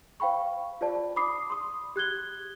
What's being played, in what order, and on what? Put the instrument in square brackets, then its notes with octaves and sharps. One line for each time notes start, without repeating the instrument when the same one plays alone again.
[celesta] C5 F5 G5 B5 C#6
F4 C5 D5 A5
B5 D6 D#6 C7
C6 D#6
G4 F#6 G#6 G7